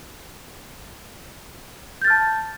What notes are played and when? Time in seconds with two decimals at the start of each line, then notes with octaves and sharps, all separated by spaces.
2.02 G6
2.04 A6
2.07 F6
2.10 A5